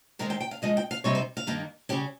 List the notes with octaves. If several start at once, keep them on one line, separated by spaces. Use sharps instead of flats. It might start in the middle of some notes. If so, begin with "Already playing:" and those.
D#3 G#3 C4 D#4 A#4
G5
G5
F5
G#2 F3 G#3 D#4 D#5
G5
F5
C3 G3 C4 D#4 C#5
C5
F5
G2 D#3 A#3 D#4
C#3 G3 C#4 G4